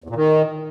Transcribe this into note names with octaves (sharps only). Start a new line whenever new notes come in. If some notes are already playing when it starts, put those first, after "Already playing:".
E2
A#2
D#3